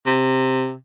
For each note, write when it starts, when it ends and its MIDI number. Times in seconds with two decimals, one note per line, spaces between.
0.06 0.74 48